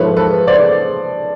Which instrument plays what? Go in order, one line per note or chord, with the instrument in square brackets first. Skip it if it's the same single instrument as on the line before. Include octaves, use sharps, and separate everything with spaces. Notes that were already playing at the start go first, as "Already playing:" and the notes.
Already playing: [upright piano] G#2 F3 A3 B4 C#5
A4 B4
C5 D5